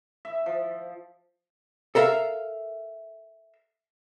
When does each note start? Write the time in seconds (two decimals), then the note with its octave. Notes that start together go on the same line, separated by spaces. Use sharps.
0.25 E5
0.46 F3
1.95 A4 A#4 E5 F5